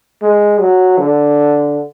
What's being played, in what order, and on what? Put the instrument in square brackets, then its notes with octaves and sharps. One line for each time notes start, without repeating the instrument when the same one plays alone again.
[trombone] G#3
F#3
D3